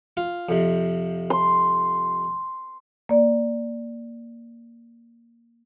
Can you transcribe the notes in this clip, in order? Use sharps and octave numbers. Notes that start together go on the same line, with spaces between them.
F4
F2 C3
C6
A#3 D5